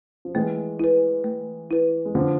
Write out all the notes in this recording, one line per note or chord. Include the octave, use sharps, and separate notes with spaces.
F3
E3 G#3 A3
E4 B4
A3
E4 B4
G#3
D3 F3 A3